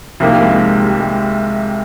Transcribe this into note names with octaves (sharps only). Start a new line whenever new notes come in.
C2 C3 D#3 F3 A#3
G3
G#3
G#3
G3
G#3